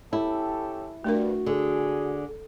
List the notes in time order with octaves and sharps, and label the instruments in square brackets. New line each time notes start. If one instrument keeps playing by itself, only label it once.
[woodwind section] C#4 G4 A4 [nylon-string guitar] E4
[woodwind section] G2 [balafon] A3 D4 A#4 [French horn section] F#4
[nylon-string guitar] D3 [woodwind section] G#4